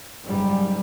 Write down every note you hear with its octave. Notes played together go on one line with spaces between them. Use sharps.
F#1 G#2 G3